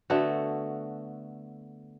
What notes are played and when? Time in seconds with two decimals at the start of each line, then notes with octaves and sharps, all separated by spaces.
0.10 D3 A3 B3 F#4